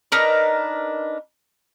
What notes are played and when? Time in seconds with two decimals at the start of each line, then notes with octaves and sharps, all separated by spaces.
0.12 D4 D#4 A#4 B4